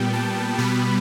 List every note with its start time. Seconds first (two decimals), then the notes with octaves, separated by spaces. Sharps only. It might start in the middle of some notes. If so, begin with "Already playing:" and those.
Already playing: A#2 G3 B3 G5
0.13 A5
0.58 B2 G3 B3 B5